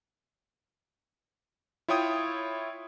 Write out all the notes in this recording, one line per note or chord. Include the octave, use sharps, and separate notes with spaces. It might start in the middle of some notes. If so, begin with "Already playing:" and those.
E4 F4 C#5 G5 D#6